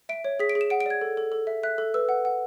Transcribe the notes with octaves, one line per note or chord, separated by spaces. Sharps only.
E5 D7
C#5
G#4 B6
D7
G#4
E7
F#5 D7
D7
D5 G#6
A4
A4
A4
E5
E5 F#6
A4
B4 E6
F#5
F#5